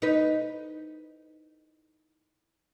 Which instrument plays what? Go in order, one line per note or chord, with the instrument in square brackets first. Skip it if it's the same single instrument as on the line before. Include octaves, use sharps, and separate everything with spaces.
[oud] D#4 B4